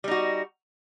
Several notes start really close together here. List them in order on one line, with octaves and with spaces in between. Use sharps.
G3 D#4 F#4